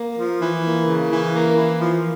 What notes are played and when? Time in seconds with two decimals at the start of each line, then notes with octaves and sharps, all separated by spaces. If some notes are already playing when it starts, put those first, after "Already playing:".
Already playing: A#3
0.18 F3
0.40 E3
0.64 A#3
0.88 C#3
1.10 E3
1.33 A#3
1.57 E3
1.81 F3